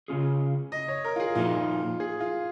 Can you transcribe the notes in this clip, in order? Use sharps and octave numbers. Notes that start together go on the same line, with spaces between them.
C#3 F3 C#4 F4 G#4
D#5
C#5
A#4
F4
G#4
A#2 F3 A#3 D#4 F4
G#4
F4